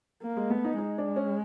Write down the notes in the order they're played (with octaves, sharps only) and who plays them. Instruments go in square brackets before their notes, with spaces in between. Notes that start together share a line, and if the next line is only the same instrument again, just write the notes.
[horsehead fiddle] A#3
[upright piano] G#3
[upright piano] A3 [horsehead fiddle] B3
[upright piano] D#4
[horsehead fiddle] G#3 [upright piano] D#4
[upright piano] D4
C#4